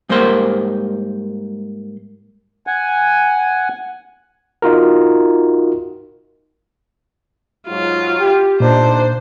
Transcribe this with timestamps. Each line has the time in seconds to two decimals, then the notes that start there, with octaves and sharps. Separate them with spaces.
0.09 G#2 G3 A#3 A#4 C5 C6
2.67 F#5 G#5
4.62 D#4 F4 F#4 A#4
7.68 G#2 F#3 F4
8.19 G4
8.60 G1 A#2 D4 D#4 C5